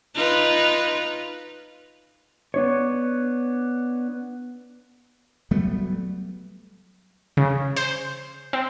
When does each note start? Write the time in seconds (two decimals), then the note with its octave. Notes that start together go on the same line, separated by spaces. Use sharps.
0.14 D#4 F4 B4
2.54 B3 D4 C#5
5.51 F#3 G3 A3 B3
7.37 C#3
7.76 C5
8.53 C4